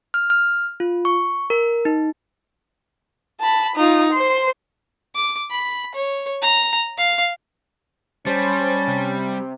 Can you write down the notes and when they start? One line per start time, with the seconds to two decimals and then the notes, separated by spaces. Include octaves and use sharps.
0.14 F6
0.30 F6
0.80 F4
1.05 C#6
1.50 A#4
1.85 D#4
3.40 A5 B5
3.76 D#4 F4
4.13 C5 C6
5.15 D6
5.51 B5
5.95 C#5
6.42 A#5
6.97 F5
8.27 G3 C#4 C5 A5
8.88 C3